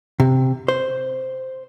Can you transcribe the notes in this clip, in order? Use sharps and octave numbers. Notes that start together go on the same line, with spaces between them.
C3
C5